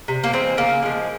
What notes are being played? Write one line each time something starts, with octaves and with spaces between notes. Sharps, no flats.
C3
A#3
E3 G#3 C4
C#3 A#3
F3 G#3